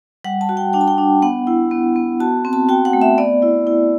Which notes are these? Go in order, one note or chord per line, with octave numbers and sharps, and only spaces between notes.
G3 F#5
A5
F#4
G5
D4 G5
A5
G5
D4
B3 F#5
E4
B3
B3
F#4 A5
C4
A5
F#4 G5
F#5
A3
E5
B3 D5
E4
E4